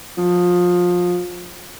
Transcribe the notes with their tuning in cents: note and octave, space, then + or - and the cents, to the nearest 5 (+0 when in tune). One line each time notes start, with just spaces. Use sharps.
F3 +25